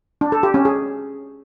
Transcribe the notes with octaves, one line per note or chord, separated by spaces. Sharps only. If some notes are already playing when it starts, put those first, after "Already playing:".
D4
A4
G4
C#4
G#4